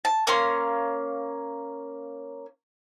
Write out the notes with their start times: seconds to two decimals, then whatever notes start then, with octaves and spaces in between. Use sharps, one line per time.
0.05 A5
0.27 A#3 C#4 F5 C6